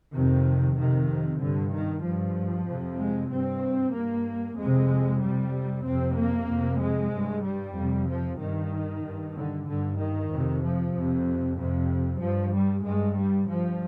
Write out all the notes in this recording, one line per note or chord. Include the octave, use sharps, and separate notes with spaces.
F2 C3 D#3
F2 C3 D#3
G2 D3
D#3
G2 F3
F2 C3
G#3
G2 C4
G2 A#3
F2 C3 G#3
F2 C3 G3
F2 C3 C4
A#3
F2 C3
G#3
G2
G3
F2 C3
F3
G2 D#3
G2
D3
G2 D3
D#3
F2 C3
F3
F2 C3
F2 C3
G2 F3
G3
G2 G#3
G3
G2 F3